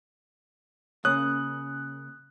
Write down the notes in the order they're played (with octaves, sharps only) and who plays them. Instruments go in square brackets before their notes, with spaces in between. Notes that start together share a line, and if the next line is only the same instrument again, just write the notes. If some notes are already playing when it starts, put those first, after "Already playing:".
[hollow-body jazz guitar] C#3 [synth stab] A#3 C#4 [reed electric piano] D#6 [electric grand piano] F#6